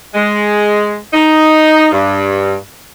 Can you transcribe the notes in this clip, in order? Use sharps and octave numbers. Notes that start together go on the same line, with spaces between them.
G#3
D#4
G2